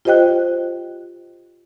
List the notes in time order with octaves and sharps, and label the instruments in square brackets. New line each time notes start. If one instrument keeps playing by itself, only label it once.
[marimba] F4 G4 C5 D#5 G5 F#6